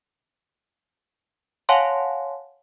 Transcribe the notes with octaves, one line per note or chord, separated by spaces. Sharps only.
C#5 F5 F#5 G#5 A5 C6